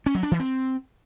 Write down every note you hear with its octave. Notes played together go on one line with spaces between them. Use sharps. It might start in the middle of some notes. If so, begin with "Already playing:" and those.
C#4
F#3
D4
E3
C4